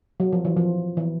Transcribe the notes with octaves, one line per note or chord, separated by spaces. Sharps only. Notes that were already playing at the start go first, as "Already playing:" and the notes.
F#3
F3
E3
F3
E3